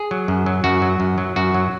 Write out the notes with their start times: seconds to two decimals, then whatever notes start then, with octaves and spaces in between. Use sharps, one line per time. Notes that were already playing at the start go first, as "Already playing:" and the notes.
Already playing: G#4
0.11 F#3
0.28 F#2
0.46 F#3
0.64 F#2 F#4
0.82 F#3
1.00 F#2
1.18 F#3
1.36 F#2 F#4
1.54 F#3